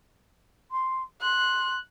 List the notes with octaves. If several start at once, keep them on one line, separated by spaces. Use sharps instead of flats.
C6
C6 F#6